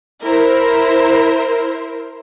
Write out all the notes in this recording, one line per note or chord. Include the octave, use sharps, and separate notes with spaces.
E4 A#4 C5